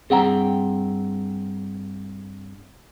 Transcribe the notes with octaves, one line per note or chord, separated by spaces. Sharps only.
G2 C4 G#4 F#5 G5 A#5